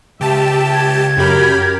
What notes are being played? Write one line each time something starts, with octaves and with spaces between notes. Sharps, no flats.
C#2 G4 E5 A5
G#6
F#2 G4 A#4 B5